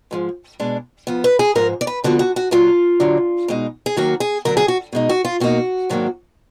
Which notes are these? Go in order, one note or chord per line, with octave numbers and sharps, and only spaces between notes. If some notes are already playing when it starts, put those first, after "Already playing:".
G#2 F3 G#3
B2 G#3 D4
F2 F3 B3
B4
G#4
G#2 F3 G#3 A#4
D5
B4
D2 D3 F3 B3 F#4
F#4
F#4
A#2 F#3 D4 F4
D2 D3 F#3 D4
B2 G#3 D#4
G#4
D#2 D#3 F#3 A#3 F#4
G#4
D2 D3 F#3 D4 A#4
G#4
F#4
B2 G#3 D#4
F#4
F4
B2 A#3 D#4 F#4
G#2 D#3 F#3 A#3 D4